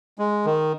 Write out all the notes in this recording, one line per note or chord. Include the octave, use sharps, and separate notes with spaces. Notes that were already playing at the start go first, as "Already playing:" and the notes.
G#3
D#3